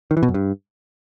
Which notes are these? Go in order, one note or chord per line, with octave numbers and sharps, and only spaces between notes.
D#3
E3
B2
F#2
G2